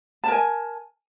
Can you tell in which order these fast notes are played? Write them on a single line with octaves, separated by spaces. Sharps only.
A5 A#4 G#5